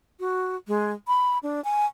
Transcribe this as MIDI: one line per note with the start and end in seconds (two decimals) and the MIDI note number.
0.20 0.56 66
0.68 0.92 56
1.07 1.38 83
1.43 1.63 62
1.64 1.85 80